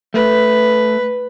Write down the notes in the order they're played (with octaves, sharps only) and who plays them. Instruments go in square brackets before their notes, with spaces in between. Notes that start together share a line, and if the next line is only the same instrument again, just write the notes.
[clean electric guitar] A3 [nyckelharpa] B4